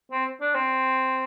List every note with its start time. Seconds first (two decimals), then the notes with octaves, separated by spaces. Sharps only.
0.12 C4
0.41 D4
0.55 C4